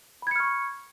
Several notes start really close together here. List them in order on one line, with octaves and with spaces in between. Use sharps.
B5 G#6 C#7 F6 C#6